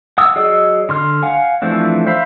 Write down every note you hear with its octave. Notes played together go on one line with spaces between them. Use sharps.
F#5 D#6 E6
F#3 G#4 D5 D#5 E6
D3 C6 F6
F5 F#5 G#5
E3 F3 A3 C4 D4
C5 E5 F5 B5